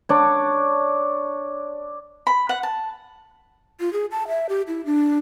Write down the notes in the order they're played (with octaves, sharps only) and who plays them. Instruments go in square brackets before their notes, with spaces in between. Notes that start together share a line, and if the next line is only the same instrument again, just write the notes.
[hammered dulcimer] D4 C#5
[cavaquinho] B5
F#5
A5
[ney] F4
G#4
A5
E5
G4
E4
D4